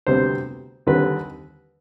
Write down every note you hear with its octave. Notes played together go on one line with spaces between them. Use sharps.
D2 C3 G3 B3 C5
D#2 D3 G3 C4 B4